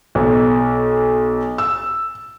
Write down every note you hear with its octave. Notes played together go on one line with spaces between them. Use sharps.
B1
E6